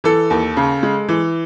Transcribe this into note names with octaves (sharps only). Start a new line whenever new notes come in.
E3 A4
D#2
C#3
G#3
E3